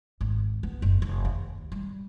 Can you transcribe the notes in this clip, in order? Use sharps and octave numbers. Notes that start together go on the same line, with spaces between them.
G#1
B3
F#1
F1
D#2
G3